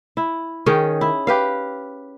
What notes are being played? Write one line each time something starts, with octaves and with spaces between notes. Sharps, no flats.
E4
D#3 C#4 G#4 G5
E4
G4 B4 F5